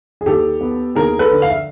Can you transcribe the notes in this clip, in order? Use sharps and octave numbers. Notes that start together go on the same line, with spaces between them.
G#4
D#2 G4 A4
B3
D#2 G#4 A#4
A4 B4
D3
F5
E5